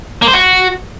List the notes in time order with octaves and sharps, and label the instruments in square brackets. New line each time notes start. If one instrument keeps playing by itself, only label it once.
[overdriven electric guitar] A#3
C5
F#4